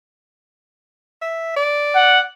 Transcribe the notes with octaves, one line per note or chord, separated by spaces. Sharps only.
E5
D5
F#5